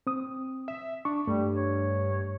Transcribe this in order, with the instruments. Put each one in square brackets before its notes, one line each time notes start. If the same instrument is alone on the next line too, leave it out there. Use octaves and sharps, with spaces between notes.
[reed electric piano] C4 D#6
[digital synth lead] E5
[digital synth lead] D4 [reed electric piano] C#6
[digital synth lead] G2 [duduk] G3 [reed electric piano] A3
[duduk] C#5